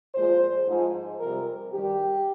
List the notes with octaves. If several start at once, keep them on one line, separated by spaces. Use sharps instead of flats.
A#2 F3 G#3 C5
G#2 F3 G#3
F2 C3 G3 A#4
G2 D#3 G3 G4